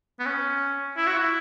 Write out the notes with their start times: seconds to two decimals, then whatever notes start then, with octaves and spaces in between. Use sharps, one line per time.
0.19 B3
0.26 C#4
0.97 E4
1.07 F#4
1.16 E4